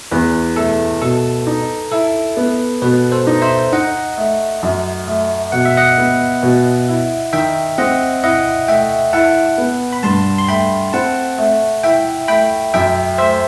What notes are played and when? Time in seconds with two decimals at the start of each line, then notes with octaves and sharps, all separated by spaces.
0.12 E2 B4
0.56 A3 A4
1.02 B2 A4
1.47 D#4
1.92 E4 A4
2.37 B3
2.82 B2 B4
3.12 A4 C5
3.27 D#4
3.42 C5 E5
3.72 D#4 D#5 F#5
4.17 A3
4.63 F#2
5.07 A3
5.52 B2 F#5
5.65 E5
5.77 D#5 F#5
5.98 B3
6.43 B2
6.88 E4
7.33 D#3 E5 G5
7.78 C4 D#5 F#5
8.23 E4 D#5 F#5
8.68 A3 E5 G5
9.13 E4 F#5 A5
9.58 B3
9.93 B5
10.03 G2 A5 C6
10.38 C6
10.48 A3 G5 B5
10.93 C4 F#5 A5
11.38 A3
11.84 E4 E5 G5
12.28 A3 G5 B5
12.74 F#2 E5 G5
13.18 A3 C5 E5